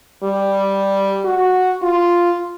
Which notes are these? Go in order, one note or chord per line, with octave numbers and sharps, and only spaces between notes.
G3
F#4
F4